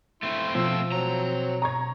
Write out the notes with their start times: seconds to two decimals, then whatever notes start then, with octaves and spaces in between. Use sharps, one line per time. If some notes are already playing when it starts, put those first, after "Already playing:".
0.23 A3 C4 E4 C6
0.55 B2 F3 F4 E6
0.92 F#3 C4 A#5
1.62 A#5 C#6 G#6